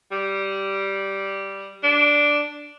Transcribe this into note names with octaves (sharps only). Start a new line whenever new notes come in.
G3
D4